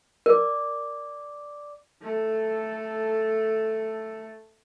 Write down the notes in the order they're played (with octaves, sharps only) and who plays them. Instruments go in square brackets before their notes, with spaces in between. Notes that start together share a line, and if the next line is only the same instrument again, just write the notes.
[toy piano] A#4 [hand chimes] D5 D6
[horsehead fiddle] A3 A4